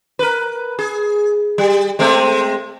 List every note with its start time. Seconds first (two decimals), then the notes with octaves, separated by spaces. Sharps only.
0.19 A#4 B4
0.79 G#4
1.58 G3
1.99 G#3 A3 C4